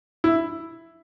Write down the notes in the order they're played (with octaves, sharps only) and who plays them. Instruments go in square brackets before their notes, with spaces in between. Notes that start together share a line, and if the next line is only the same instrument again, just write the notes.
[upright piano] E4